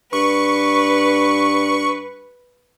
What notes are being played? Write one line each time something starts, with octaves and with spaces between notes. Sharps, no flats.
G2 B4 C#6